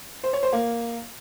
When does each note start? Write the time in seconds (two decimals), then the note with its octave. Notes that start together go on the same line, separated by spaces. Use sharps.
0.24 C5
0.33 C#5
0.43 C5
0.53 A#3